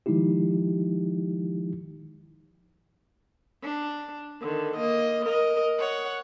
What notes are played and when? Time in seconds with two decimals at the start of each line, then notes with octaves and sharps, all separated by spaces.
0.06 D#3 F3 G#3 D#4 E4 G4
3.62 D4
4.41 D3 D#3
4.76 A#3 D#5
5.25 A#4 D#5
5.79 C#5 F#5